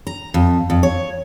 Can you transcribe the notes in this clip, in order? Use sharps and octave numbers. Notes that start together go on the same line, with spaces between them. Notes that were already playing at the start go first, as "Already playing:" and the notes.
A#5
F2
F2
C#5